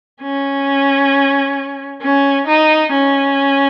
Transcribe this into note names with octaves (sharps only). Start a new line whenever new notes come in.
C#4
C#4
D#4
C#4